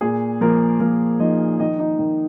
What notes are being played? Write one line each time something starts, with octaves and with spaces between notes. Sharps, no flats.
A#2 G#4
F3 A#3 A#4
F3 A#3 A#4
F3 D#4 D#5
D#3 D#4 D#5
D#4 D#5
D#3